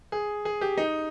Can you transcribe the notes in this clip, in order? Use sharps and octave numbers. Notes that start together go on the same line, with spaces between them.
G#4
G#4
G4
D#4